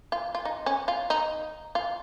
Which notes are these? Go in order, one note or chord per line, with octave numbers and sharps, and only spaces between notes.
F4
F4
D#4
C#4
F4
D#4
F4